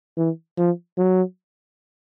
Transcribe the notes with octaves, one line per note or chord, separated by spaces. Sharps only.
E3
F3
F#3